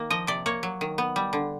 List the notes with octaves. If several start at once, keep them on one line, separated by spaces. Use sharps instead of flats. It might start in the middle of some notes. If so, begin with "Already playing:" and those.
Already playing: D#3 A#3
F3 D#5
C3 D5
A#3 C#5
F#3
D#3
B3
G3
D3